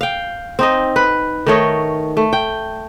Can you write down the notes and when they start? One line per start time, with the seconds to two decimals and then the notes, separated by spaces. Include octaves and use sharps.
0.01 F5 G5
0.59 C4 D#4 D#5
0.96 B4
1.46 D#3 A3 C#5 D#5
2.17 A3
2.33 G5